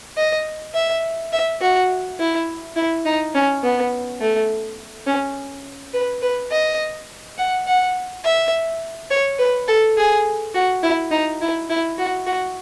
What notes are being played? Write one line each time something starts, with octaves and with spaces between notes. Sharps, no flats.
D#5
E5
E5
F#4
E4
E4
D#4
C#4
B3
A3
C#4
B4
B4
D#5
F#5
F#5
E5
C#5
B4
A4
G#4
F#4
E4
D#4
E4
E4
F#4
F#4